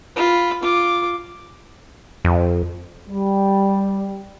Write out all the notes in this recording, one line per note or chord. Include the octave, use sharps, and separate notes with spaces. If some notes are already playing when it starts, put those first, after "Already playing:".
F4 B5
F4 D6
F2
G3